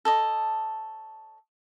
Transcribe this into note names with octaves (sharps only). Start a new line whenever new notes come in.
A4 C#5 D#5